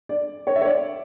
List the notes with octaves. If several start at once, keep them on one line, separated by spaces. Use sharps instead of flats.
D5
C#5
E5
C#5
D5